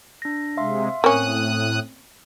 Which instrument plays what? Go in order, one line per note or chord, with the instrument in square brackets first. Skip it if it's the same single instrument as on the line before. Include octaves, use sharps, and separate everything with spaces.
[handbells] D4 A#6
[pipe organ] C3 G#3 [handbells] E5 F5 C6
[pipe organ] A2 D#6 F#6 [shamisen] A#3 C#4 [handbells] C4